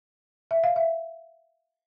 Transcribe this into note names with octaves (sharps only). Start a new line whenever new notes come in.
E5
F5
E5